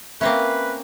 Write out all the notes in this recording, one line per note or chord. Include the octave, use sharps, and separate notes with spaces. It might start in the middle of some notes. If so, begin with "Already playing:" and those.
A#3 C4 C#4 B4 E5